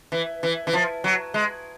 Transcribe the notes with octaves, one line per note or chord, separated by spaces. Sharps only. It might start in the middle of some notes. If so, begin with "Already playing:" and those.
E3
E3
E3
F3
F#3
G#3